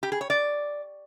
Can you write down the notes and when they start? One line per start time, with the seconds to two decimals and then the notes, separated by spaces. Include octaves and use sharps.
0.03 G4
0.12 G#4
0.21 C#5
0.30 D5